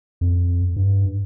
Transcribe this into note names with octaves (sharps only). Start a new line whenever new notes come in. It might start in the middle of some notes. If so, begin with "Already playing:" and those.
F2
G2